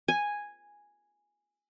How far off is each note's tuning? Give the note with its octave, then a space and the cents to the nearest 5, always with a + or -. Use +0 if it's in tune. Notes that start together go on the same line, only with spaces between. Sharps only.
G#5 -5